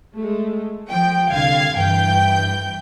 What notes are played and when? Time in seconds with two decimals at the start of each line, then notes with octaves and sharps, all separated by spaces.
0.17 G#3 A3
0.88 F3 G5
1.32 C2 D3 F5 G#6
1.75 G2 E3 G5 G6